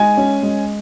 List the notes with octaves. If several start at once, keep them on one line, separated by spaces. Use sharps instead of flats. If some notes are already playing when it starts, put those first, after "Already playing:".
Already playing: G#3 D#4 G#5
C#4
G#3